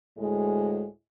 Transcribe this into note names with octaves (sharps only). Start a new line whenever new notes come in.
D2 A2 G#3